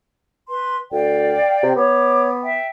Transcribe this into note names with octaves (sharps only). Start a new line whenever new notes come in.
B4 C6
D2 D5 F5 G5
C3
B3 C#5 D6
E5 G5